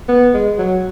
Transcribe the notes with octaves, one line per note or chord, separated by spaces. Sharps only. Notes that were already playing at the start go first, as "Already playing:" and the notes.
B3
G#3
F#3